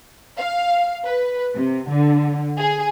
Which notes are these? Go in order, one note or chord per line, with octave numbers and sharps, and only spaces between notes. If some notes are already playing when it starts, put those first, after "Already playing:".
F5
B4
C3
D3
G#4